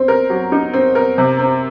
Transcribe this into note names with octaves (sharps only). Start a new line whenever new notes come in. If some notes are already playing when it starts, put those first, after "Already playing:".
Already playing: C4
A#4
F#3
D#4
C4
A#4
C3
C4